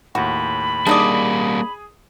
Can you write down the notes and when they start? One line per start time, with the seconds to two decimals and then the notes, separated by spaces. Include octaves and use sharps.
0.15 D#2 A2 F#4 B5
0.87 G3 A#3 D4 D#4 G#4 D5 D#6